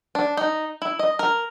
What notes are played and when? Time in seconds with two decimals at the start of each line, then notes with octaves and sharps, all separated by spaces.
0.15 D4
0.37 D#4
0.82 E4
0.99 D#5
1.19 A#4